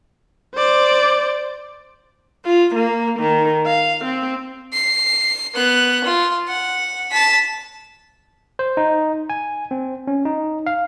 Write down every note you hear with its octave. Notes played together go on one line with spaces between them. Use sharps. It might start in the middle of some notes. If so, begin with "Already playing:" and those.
C5 D5
F4
A#3
D#3
F5
C4
C7
B3 F#6
F4
F#5
A5 B6
C5
D#4
G#5
C4
C#4
D#4
F5